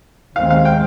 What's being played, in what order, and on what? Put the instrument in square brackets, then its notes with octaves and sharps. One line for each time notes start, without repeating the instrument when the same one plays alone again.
[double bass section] D#2 D#3 G#3 C4 [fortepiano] F5
[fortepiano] F5
G5